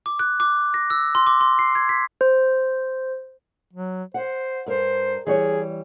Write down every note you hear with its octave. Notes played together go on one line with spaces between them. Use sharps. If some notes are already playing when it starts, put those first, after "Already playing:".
D6
F#6
D6
A#6
E6
C6
D6
C6
C7
G#6
B6
C5
F#3
C5 F#5
G2 A#4 C5
E3 G3 G#4 C#5